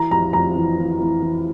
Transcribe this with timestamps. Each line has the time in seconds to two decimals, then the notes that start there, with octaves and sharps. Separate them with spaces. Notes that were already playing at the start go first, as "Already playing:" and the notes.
Already playing: E3 A#5
0.11 F2 A#5
0.33 F2 A#5
0.56 E3
0.78 E3
1.00 E3
1.22 E3